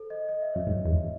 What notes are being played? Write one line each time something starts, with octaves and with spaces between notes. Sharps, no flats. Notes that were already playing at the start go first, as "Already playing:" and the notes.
Already playing: A4 C5
D#5
D#5
E5
F#2 C#5
G#2
E2